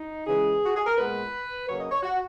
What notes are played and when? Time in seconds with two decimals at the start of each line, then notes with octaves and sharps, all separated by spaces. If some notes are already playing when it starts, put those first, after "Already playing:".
Already playing: D#4
0.27 C#3 E3 G#3 G#4
0.65 F#4
0.76 G#4
0.86 A#4
0.97 A#2 G#3 B3 B4
1.68 C#3 F#3 A#3 C#5
1.79 D#5
1.91 C#5
2.03 F#4